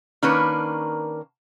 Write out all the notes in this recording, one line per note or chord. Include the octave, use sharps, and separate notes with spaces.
D#3 A#3 C#4 D4 A#4 B4